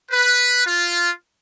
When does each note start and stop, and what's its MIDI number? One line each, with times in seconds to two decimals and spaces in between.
0.11 0.63 71
0.67 1.11 65